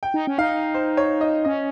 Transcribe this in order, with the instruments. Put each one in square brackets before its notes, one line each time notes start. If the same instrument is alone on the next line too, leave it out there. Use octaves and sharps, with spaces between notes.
[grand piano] G5
[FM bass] D#4
C#4
[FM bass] D#4 [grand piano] F5
[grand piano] C5
C#5
D#5
[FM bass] C#4 [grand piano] D#5